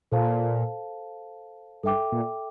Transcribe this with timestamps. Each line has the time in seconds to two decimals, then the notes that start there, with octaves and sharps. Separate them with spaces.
0.12 A#2 A4 C5 F5 A5
1.83 G2 A4 E5 G5 D6
2.12 A#2